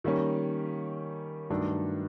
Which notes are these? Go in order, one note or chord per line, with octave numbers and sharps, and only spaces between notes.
D#3 G3 A#3 C#4
G2 D#3 F#3 A3 D4